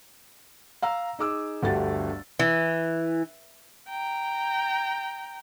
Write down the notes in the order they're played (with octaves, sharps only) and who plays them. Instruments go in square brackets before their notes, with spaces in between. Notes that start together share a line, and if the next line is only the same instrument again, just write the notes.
[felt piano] F5 A#5 E6
D#4 G#4 D6 E6
G1 D2 A3 F#4 G4 A6
[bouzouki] E3
[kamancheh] G5 A#5